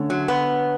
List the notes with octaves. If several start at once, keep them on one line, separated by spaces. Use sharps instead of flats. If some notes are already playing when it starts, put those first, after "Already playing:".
Already playing: D3 A3 C#4
F#3
B3